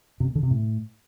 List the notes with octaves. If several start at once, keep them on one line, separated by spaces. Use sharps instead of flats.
C3
A#2
D3
C3
A2